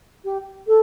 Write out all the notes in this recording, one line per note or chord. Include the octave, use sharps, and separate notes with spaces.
G4
A4